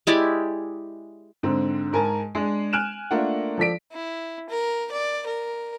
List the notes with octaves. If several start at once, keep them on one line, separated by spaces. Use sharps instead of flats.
G#3 E4 G4 D5
G#2 D3 C4
G#2 A#4 G#5 A5
G#3 D4 G#4
G#5 F6 F#6 D7 E7
A3 A#3 D4 F4 A#4 F#5
F3 A4 D5 B6 D7
E4
A#4
D5
A#4